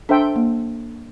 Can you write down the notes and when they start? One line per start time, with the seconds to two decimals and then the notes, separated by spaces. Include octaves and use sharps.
0.09 D4 A4 C5 E5 G5
0.36 A#3